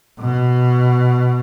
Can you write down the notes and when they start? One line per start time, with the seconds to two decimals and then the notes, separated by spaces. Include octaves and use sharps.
0.21 B2